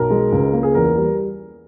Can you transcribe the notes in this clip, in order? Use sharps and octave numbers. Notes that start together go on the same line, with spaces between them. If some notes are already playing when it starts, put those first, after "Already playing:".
Already playing: B1 A#4
G#3
C#2
A#3
G#4
E2 A#4
G3